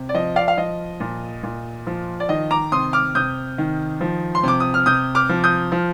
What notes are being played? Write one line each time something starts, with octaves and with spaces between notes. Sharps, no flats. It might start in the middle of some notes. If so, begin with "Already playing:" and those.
Already playing: C3
D5
F3 D#5
D5 F5
F5
F3 D#5
A#2
A#2
F3
D5
D#3 D#5
A#5 D6
C3 C6 D#6
D6 F6
C3 D#6 G6
D#3
F3
C6
C3 D6
D#6
F6
C3 D#6 G6
D6 F6
F3
D#6 G6
F3